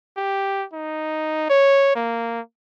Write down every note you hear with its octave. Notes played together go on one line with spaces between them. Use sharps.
G4
D#4
C#5
A#3